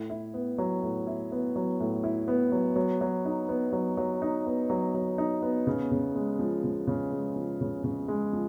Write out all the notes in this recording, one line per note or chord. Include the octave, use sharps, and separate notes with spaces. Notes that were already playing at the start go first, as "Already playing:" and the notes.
Already playing: A2
E4
B3
F#3
A2
E4
B3
F#3
A2
E4
B3
F#3
F#3
F#3
D#4
B3
F#3
F#3
D#4
B3
F#3
F#3
D#4
B3
C#3
C#3
G#3
F3
C#3
C#3
G#3
F3
C#3
C#3
G#3
F3